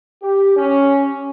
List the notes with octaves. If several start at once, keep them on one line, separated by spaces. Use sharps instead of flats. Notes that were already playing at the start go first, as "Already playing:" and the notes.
G4
C#4